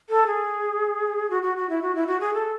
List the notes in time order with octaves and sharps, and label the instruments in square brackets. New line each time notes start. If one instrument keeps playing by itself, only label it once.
[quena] A4
G#4
F#4
F#4
F#4
E4
F#4
E4
F#4
G#4
A4